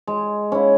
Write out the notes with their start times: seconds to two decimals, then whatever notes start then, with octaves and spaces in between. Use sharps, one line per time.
0.07 G#3
0.52 C#4 E4